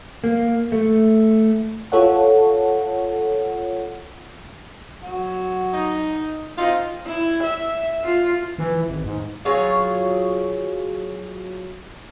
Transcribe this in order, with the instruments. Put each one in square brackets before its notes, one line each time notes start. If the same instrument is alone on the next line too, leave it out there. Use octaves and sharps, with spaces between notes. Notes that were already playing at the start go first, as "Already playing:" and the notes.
[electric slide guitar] A#3
A3
[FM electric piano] F4 A4 C#5 F#5
[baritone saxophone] F#3
[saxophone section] D#4
[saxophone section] C4 D#4 [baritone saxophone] F4
[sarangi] E4
E5
F4
[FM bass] E3
G#1
G#2
[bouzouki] F#3 F4 G#4 C#5